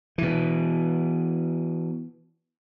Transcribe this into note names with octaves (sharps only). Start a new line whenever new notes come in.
B2 E3